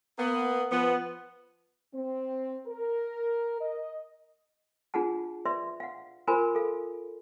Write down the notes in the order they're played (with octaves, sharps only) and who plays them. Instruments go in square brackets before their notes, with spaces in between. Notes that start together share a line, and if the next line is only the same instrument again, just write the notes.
[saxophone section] A#3 B3
F3 B3
[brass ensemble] C4
A#4
D#5
[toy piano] D4 F4 G#4 F#5 A5
B4 D5 E5 C6
F5 F#5
F4 A#4 C5 G#5 B5 C6
A4 F5